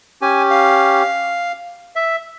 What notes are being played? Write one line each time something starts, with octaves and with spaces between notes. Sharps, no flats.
C#4 G4 G#5
F5
E5